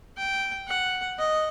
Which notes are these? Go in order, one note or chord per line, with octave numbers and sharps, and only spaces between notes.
G5
F#5
D#5